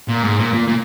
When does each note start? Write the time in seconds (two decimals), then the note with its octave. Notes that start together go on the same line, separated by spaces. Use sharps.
0.09 A#2
0.24 G#2
0.39 A#2
0.54 A#2
0.69 A#2